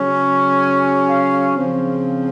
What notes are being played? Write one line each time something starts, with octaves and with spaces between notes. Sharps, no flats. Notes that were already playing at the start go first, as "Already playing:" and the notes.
Already playing: C#3 F#3 C#4
G#5
F5
C#3 F3 C4